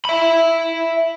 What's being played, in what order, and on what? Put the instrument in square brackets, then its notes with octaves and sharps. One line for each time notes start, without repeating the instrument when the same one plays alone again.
[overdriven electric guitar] E5 B5